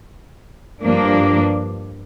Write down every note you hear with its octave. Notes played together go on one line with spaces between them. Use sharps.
G2 F3 A#3 D4